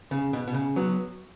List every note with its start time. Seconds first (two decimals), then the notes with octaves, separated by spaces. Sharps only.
0.11 C#3
0.33 B2
0.47 B2
0.54 C#3
0.76 F#3 B3